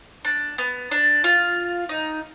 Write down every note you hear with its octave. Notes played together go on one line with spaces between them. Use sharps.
D4
B3
D4
F4
D#4